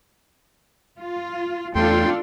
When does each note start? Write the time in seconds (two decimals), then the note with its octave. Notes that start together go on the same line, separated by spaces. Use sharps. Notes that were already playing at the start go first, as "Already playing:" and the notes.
0.99 F4
1.75 E2 A3 D4 F4 A4 G5 C6